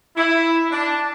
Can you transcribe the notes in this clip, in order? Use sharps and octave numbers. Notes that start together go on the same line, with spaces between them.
E4
D4